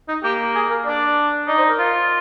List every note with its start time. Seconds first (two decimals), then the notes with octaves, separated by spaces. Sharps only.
0.08 D#4
0.23 A#3 G4
0.55 G#4
0.70 A#4
0.86 D4 D5
1.48 D#4 D5
1.58 C5
1.69 A#4
1.79 F4